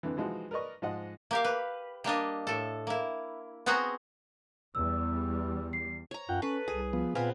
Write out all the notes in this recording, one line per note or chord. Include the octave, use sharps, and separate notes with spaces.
F2 D3 E3
E3 F3 G#3 D#4 F#4
A#4 B4 D5 D#5 C#6
G#2 F3 D#5 F#5
A#3 G4 F5
B4
G3 A#3 D4 D#5
A2 A4
A#3 E4
B3 C4 F#4 G#4 F#5 A#5
E2 G3 E6
C7
C#5 A#5
F#2 F4 F#5 G5
C#4 A4 B4
C2 G#4
F3 B3
A#2 B3 C4 B4 F5 G#5